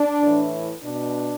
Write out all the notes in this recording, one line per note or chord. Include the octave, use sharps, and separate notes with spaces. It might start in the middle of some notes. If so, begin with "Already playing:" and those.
Already playing: D4
A2 E3
B2 D4